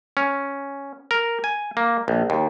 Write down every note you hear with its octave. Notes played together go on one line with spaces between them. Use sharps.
C#4
A#4
G#5
A#3
A#1
D#2